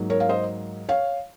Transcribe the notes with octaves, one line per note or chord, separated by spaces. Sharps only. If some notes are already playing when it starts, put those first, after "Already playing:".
Already playing: G#2 F#3 A#3
A#4 C#5
F5
C5 D#5
C#5 F5